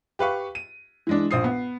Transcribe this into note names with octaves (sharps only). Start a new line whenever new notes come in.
G4 B4 F5 C#6
D#7
E3 G#3 D4
A#1 C5 D#6 C7
B3